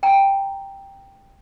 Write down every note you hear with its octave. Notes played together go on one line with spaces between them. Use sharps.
G5 A#5